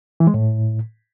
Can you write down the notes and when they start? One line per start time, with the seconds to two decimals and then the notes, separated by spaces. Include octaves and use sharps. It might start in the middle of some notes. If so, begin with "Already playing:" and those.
0.20 E3
0.27 G#3
0.34 A2